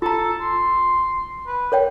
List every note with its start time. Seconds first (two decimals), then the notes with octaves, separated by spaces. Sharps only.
0.02 F4 A4 A#5
0.40 C6
1.47 B4
1.72 A#4 C#5 G5